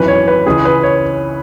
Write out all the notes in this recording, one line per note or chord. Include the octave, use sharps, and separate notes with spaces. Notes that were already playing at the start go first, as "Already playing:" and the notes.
Already playing: G#1 F#2 E3 B4
C#5
B4
C#2 C#3 E3 G#3 G#4
B4
C#5